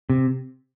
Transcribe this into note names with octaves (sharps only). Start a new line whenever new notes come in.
C3